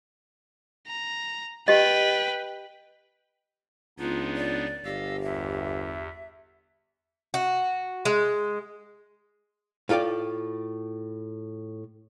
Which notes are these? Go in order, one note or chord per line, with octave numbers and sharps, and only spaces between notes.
A#5
G4 B4 D#5 G5
C#2 B3 D4 D#4 F4
D5
G1 G4 D#5 F5 E6
E2 E5
F#4
G#3
A2 F4 A4 D5 G5